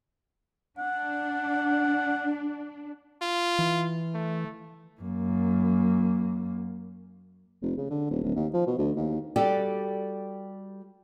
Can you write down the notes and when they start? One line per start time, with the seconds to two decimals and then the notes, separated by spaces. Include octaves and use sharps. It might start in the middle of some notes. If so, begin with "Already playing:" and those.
0.78 D4 F#5
3.22 F4
3.59 E3
4.14 A3
5.01 F#2 A#3
7.62 F1
7.77 C#3
7.90 D3
8.10 D#1
8.23 D1
8.36 D#2
8.54 F3
8.67 B2
8.79 D2
8.96 D#2
9.36 G3 F#4 G4 A4 D5